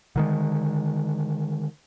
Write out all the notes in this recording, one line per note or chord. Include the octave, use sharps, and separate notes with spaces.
D3 D#3 G#3